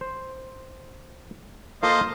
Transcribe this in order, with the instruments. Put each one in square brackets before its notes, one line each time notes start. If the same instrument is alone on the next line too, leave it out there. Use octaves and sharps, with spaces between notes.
[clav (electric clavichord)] C5
[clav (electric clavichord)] A#3 F4 A4 [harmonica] C5 D#5 F5